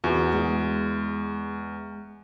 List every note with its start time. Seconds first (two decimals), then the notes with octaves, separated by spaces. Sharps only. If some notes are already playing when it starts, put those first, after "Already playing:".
0.04 E2 F#4
0.32 G#3